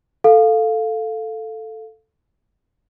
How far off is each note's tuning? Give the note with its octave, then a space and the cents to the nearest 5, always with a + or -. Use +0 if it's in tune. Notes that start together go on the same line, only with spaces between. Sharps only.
A4 +0 F5 +5